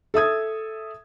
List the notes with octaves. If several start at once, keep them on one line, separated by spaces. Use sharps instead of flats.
A4 E5 D#6 G#6